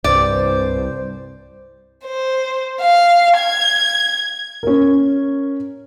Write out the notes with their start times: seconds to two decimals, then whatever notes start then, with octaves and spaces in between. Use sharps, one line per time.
0.04 C2 G2 C3 C5 D5
2.05 C5
2.81 F5
3.38 G#6
4.63 C#4 A#4